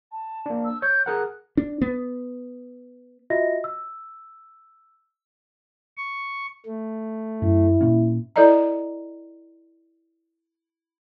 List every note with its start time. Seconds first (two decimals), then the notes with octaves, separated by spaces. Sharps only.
0.12 A5
0.46 A#3 D4
0.65 E6
0.82 C#5 G6
1.06 G#4 A#4 F#5 F#6
1.57 D4
1.81 B3
3.30 F4 F#4 D#5 E5 A#6
3.64 E6
5.97 C#6
6.66 A3
7.42 F#2 E4
7.81 A#2 A#3 C#4
8.36 E4 A4 D5 D#5 A#5